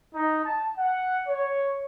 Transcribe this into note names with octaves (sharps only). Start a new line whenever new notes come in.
D#4
A5
F#5
C#5